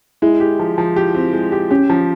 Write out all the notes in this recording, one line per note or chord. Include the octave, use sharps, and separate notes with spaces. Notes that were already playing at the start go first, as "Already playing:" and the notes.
G#3 E4
G4
F3
F3
G4
C4
G#3
G4
C#4 G4
F3